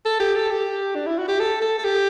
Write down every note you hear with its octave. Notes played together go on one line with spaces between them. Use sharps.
A4
G4
A4
G4
D4
E4
F#4
G4
A4
A4
A4
G4